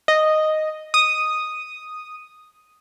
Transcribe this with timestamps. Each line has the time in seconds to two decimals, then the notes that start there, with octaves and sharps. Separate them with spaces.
0.08 D#5
0.94 D#6